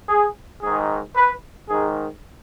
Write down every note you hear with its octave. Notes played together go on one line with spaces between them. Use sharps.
G#4
G#2 D#3 G#4
B4
G#2 D#3 G#4